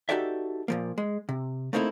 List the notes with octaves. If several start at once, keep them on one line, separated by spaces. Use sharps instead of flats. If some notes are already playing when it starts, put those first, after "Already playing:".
D#4 F#4 G4 A4 D5 E5
A#2 F3 A#3
G#3
C3
A3 A#3 C4 D#4 E4 A4